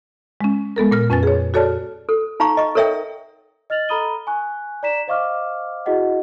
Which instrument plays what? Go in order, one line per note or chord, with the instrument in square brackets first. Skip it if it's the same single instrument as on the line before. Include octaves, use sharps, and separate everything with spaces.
[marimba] G#3 C#4
G#3 B3 A4 A#4
A#2 A#4 F6
F2 C#4 B4 G#5 A6
G#4 C#5
F#4 A4 C#5 D5 A5 F6
[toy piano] A4
D#4 F5 A#5 C#6
D#5 C#6
A4 A#4 C#5 E5 F#5 G5
[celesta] D#5 F6 A6 F7 F#7
A4 A#5 B5 D#6 D#7 G7
G#5 C#6 F#6
D5 A#5 B6 E7
C5 D#5 F5 C#6 D6 F6
E4 F#4 G#4 D#5 F#5